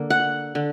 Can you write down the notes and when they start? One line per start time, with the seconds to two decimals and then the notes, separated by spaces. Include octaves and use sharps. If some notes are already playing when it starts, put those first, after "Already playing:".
Already playing: D3 A#3
0.10 F#5
0.55 D3